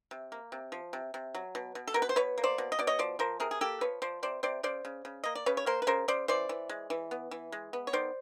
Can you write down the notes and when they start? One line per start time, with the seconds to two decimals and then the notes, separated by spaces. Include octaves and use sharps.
0.11 C3
0.32 A#3
0.52 C3
0.72 F3
0.93 C3
1.14 C3
1.35 F#3
1.55 B2
1.75 B2
1.87 A4
1.94 B2 A#4
2.02 B4
2.09 C5
2.16 B2 B4 C#5
2.38 A#3
2.44 C5 D5
2.58 B2
2.72 D#5
2.79 B2 D5
2.87 C#5 D#5
2.99 F3 C5 D5
3.19 F3 A#4 C5
3.40 C3 G#4 A#4
3.51 G#4
3.61 A#3 G4 A4
3.81 F3 B4 C#5
4.02 F3 C5 D5
4.23 C3 C5 D5
4.43 C3 C5 D5
4.63 C#3 C5 D5
4.85 C#3
5.05 C#3
5.24 A#3 D#5
5.35 D5
5.46 C#3 B4 C#5
5.57 C#5
5.66 A#3 A#4 C5
5.82 B4
5.87 C#3 A#4 C5
6.08 C#3 C5 D5
6.28 E3 C5 D5
6.49 E3
6.69 G#3
6.90 E3
7.11 B3
7.31 E3
7.52 G#3
7.73 B3
7.87 C#5
7.93 D#3 C5 D5